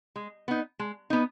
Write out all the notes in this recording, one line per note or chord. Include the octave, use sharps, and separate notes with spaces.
G#3
B3 D#4
G#3
B3 D#4